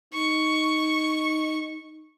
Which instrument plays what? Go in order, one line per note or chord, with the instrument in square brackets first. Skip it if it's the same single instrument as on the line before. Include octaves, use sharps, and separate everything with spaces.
[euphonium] D#4 [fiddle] C#6